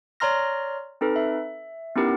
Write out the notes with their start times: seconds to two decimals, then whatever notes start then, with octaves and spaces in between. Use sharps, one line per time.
0.20 C#5 D5 A#5 C6 F6 A#6
1.01 C4 D#4 A4 B4
1.16 E5
1.96 B3 C#4 D#4 E4 G4 A#4